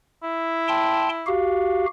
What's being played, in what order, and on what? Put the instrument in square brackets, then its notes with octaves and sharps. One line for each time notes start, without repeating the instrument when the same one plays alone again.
[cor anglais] E4
[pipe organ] G5 A5 C6
F#4 G4 F5